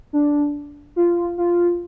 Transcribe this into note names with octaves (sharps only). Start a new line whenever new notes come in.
D4
F4
F4